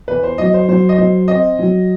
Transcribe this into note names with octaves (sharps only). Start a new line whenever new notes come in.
E2 B4
C5
F#3 D#5
C5
F#3 C5
D#5
F#3 C5
C4 D#5
F#3